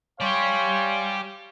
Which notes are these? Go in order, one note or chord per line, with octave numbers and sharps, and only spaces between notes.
G4 C#5 D5 F5 G#5 C6